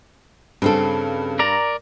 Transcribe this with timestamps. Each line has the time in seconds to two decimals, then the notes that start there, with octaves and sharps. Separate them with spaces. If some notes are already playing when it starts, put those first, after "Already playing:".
0.62 G2 C#3 C4 A4
1.39 A#4 D5 A#5